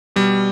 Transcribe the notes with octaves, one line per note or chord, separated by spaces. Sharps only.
B2 G3